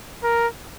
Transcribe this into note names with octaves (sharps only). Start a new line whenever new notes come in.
A#4